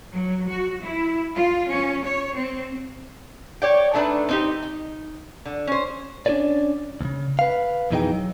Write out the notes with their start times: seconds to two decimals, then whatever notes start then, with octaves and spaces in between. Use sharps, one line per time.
0.14 F#3
0.49 F#4
0.84 E4
1.35 F4
1.70 C#4
2.04 C#5
2.35 C4
3.62 C#5 D5 G5
3.94 D#3 A3 D4 B4
4.29 C4 D#4 G4
4.63 D#4
5.46 D3
5.67 C#4 C5
6.26 C#4 D4 F#4 B4 C#5 D5
7.01 D2 C#3
7.39 B4 F5
7.91 F2 B2 E3 D#4 G#4 G5
8.13 F#3